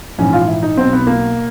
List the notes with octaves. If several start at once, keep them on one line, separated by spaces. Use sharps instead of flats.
A#1 G#2 E3 C#4
F4
E4
D#4
B1 B2 C4
B3
A#3